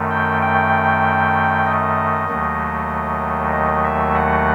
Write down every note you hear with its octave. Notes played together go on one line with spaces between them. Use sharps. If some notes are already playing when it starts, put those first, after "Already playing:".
Already playing: F#2 D#3 A3
G5
G5
D#5
D#2 D#3 F#3 A3
D#5
E5
F#5